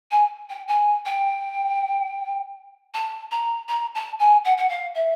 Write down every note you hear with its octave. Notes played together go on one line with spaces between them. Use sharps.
G#5
G5
G#5
G5
A5
A#5
A#5
A5
G#5
F#5
F#5
F5
E5